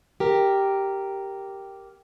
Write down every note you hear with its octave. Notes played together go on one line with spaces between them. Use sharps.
G4 A#4